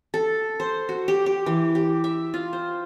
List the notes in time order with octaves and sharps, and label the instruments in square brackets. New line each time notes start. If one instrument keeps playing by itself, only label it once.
[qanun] A4
C5
F#4
G4
G4
E3
G4
E5
F4
C5